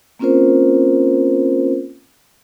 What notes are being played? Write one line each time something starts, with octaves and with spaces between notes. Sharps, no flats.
A#3 C4 C#4 F4 A#4 C5